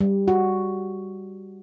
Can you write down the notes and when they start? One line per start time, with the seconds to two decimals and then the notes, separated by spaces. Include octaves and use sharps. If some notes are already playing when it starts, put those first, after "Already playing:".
0.01 G3
0.28 F#4